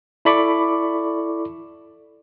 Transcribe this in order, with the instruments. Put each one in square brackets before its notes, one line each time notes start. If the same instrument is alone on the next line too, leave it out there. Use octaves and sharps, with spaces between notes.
[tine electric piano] E4 A4 D5 B5 C#6 D6